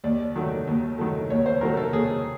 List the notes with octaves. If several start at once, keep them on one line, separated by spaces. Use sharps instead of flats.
D#2 D5
D#3 F#3 A3
D#2
D#3 F#3 A3
D#2 C#5
C5
D#3 F#3 A3 A#4
A4
D#2 G#4